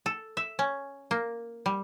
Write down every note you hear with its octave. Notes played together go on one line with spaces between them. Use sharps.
A4
E5
C#4
A#3
G3